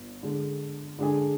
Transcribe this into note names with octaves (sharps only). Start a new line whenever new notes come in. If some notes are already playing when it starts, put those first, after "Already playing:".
Already playing: G1
D3 G#3 D4
D3 G#3 D4 G#4